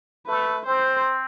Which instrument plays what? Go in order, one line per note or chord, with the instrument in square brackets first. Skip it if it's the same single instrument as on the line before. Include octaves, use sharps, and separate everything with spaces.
[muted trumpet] A3 [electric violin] B4
[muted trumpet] C4 [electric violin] C5